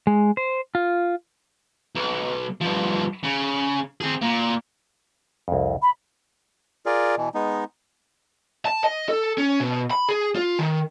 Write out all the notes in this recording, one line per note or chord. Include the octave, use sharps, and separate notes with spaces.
G#3
C5
F4
B1
G2 F3
C#3
C4 G#4
A#2
C2 F2
B5
F4 G#4 A#4 D5
B2 E3
G#3 B3 D#4
A5
D#5
A4
C#4
B2
B5
G#4
F4
D#3